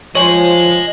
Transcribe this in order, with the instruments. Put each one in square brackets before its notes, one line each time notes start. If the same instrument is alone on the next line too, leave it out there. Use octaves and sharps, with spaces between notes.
[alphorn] F3 [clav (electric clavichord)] C5 C#5 [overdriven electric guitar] D#5 G#5 [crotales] F#7